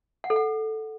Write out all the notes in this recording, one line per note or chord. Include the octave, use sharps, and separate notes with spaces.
F#5
A4
F#5